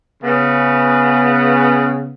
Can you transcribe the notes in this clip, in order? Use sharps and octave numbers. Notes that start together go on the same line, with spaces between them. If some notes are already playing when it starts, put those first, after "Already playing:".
C#3 B3